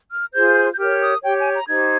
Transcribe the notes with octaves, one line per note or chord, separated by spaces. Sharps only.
F6
F4 G#4 C5 G6
G6
G4 A#4 C#5 F6
D#6
G4 C#5 G5
G#5
A#5
D#4 G4 C5 G#6